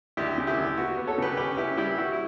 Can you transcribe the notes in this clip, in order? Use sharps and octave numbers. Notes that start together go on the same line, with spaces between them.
D2 E4 G4
C#3
E4 G4
D2
B3 F#4
B3
A4 C#5
C#3 G4 B4
C#4 G4 B4
C#4 E4 G4
G3 E4 G4
E4 F#4
E4